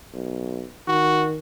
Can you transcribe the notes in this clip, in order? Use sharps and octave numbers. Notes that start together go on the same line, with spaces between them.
B1
D#3 F#4